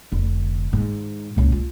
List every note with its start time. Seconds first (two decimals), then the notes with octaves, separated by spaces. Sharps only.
0.12 F1 D3
0.73 G#2 D#3
1.36 C#2 A#2
1.52 F4